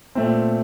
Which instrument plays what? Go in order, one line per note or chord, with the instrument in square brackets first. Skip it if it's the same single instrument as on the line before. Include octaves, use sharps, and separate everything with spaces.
[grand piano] A#2 A3 C4